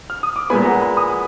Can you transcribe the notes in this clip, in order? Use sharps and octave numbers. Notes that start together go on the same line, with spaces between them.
F6
D#6
D6
A#2 G#3 B3 G#5 B5
F#5 A#5
G#5 B5
B5 D#6